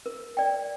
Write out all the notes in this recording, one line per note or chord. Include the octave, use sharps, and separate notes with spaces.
A#4
D5 G5